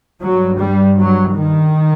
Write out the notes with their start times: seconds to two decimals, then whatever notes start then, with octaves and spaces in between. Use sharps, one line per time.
0.22 G2 F#3
0.60 G3
0.99 F#3
1.37 D#3